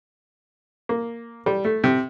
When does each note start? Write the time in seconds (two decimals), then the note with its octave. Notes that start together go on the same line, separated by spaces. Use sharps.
0.89 A#3
1.46 G3
1.65 A3
1.84 C3